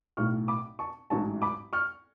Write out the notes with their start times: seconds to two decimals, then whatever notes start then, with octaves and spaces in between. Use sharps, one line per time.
0.17 B1 A2 F#3 C#6 F6
0.48 B5 D6
0.79 A5 C#6
1.10 A1 G#2 F#3 C#4 A5 C#6
1.42 B5 D6
1.73 C#6 F6